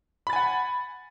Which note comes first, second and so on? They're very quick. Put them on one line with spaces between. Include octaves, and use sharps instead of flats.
B5 A6 G#5 F#5